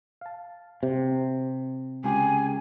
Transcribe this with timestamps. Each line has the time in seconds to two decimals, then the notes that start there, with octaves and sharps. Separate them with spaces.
0.21 F5 A5
0.83 C3
2.04 C#2 G4 G#4 G#5